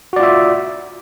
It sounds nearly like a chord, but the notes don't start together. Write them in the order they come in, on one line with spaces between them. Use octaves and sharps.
F#4 D5 F4 E5